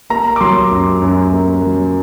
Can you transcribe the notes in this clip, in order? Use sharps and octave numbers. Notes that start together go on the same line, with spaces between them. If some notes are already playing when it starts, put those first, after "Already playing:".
A#3 A#5
D6
F#3 C6
F#2
F#2
A#3
F#3